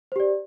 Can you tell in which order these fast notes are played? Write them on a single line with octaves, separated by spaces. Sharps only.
C5 G4 D5